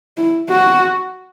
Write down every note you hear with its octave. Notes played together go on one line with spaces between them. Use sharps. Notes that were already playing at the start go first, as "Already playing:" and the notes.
E4
F#4